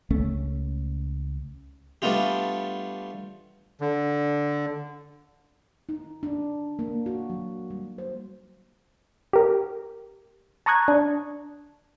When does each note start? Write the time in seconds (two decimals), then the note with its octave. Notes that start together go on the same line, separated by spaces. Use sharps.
0.10 C#2 A3 C#4
2.02 G3 A3 B3 D4 F4 G4
3.81 D3
5.89 D#4
6.23 D4
6.79 A#3
7.06 F#4
7.30 F#3
7.70 G3
7.98 C5
9.33 G4 A#4
10.66 A5 A#5 C#6 D#6 F#6 G#6
10.88 D4